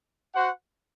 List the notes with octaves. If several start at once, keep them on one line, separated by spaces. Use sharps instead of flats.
F#4 C5 F#5